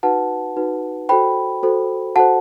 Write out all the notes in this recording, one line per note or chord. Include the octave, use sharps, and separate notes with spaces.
D#4 F#4 B4 F#5 A5
D#4 F#4 B4
F#4 A4 C5 G5 B5
F#4 A4 C5
F#4 A4 C5 F#5 A5